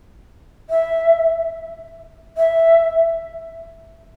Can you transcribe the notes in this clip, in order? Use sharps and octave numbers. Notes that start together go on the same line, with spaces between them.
E5
E5